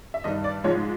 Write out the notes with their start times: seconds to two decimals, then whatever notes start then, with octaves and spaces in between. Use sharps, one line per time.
0.14 E5
0.24 G2 D#3 G3 D#5
0.44 D5
0.64 G#2 F3 G#3 C#5